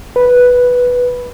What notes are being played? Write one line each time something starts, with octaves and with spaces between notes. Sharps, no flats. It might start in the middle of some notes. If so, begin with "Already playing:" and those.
B4